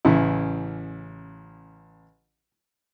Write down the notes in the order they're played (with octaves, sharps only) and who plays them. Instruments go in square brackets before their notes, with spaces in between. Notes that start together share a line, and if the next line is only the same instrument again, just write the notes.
[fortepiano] A1 C#3 E4